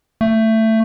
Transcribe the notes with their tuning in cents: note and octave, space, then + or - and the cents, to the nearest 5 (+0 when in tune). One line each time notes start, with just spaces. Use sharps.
A3 +15